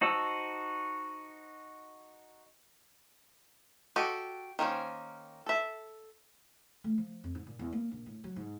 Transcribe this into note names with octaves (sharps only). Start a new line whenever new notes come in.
D#4 F#4 C5 A5 E6
F#4 G4 A4 D#5
D#3 A#3 C#4 C5
A4 E5
A3
F3
F2
G#2
A#2
E2
A#3
A#1
A2
F#3
G#2